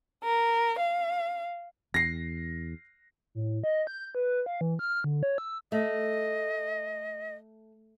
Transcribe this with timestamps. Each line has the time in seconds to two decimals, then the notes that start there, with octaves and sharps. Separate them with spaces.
0.24 A#4
0.77 F5
1.94 E2 A#6 C7
3.35 A2
3.64 D#5
3.87 G6
4.15 B4
4.46 F5
4.61 E3
4.79 F6
5.04 D3
5.23 C#5
5.38 E6
5.72 A3 D#5